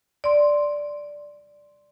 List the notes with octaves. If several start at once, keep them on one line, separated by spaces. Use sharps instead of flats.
D5 C6